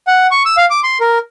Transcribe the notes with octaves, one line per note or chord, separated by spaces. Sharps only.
F#5
C#6
E6
F5
D6
C6
A#4